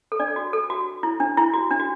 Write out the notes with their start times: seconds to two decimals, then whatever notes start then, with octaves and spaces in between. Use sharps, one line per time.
0.12 A4
0.20 D4 D5
0.28 A4
0.36 F#4
0.53 A4
0.70 F#4
1.03 E4
1.20 D4
1.37 E4
1.53 F#4
1.71 D4
1.80 F#4